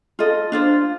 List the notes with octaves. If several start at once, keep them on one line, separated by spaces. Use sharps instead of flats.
F4 A4 D#5
D4 F4 C5